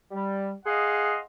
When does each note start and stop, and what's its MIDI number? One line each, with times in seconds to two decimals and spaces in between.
0.11 0.52 55
0.66 1.18 68
0.66 1.18 75
0.66 1.18 77
0.66 1.18 78
0.66 1.18 84